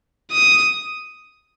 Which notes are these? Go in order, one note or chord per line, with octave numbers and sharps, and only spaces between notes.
D#6